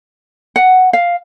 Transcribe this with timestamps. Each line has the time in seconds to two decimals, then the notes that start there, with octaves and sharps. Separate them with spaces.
0.56 F#5
0.93 F5